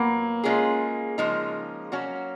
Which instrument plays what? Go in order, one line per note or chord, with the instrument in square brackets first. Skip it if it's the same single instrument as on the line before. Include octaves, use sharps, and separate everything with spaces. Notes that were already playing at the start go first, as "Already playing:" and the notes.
Already playing: [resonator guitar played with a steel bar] A#2 F#3 B3 [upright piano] A#3
[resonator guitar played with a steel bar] G#3 C#4 F4 G#4
C#3 F3 G#3 D#4
F#3 C#4 F#4